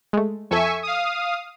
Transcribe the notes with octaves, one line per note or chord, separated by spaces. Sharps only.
G#3 A3
F2 A4 E5 G#5 C#6
F5 D#6